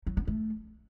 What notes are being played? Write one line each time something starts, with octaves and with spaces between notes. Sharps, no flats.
F#3
B3
A3